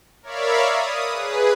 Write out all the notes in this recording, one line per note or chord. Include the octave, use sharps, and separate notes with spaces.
A#4 C#5 D5 E5 F5 B5
D#6
G#4 B4